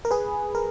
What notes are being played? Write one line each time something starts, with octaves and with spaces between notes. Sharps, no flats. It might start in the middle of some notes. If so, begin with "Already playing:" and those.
A#4
G#4 B4
A#4